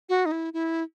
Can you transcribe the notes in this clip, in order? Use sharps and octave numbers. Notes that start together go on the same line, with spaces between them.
F#4
D#4
E4
E4